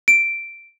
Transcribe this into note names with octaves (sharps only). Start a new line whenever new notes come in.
D7